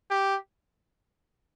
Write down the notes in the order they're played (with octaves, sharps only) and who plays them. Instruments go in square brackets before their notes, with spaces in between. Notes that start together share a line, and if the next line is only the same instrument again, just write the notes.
[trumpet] G4